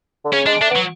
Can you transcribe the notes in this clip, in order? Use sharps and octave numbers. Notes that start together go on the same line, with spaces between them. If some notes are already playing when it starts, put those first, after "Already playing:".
D3
C#3 C#4
G#3 D4
A3 D4
B3
F#3